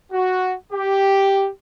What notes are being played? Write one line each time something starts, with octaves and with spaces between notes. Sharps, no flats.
F#4
G4